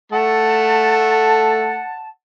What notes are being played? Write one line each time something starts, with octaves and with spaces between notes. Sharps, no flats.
A3 F#5 A5